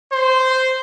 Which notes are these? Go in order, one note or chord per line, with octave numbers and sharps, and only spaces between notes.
C5